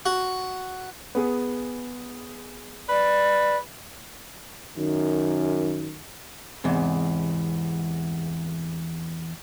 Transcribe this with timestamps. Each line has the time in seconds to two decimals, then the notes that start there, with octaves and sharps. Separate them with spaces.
0.06 F#4
1.15 B3 G#4
2.89 B4 D5
4.77 F#2 D#3
6.64 E2 G#2 C3